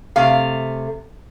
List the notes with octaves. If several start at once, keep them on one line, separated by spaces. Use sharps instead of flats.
C3 A3 F5